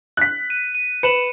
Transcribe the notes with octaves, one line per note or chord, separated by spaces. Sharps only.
F#6 B6
D#7
D#7
B4 C#7 E7 F#7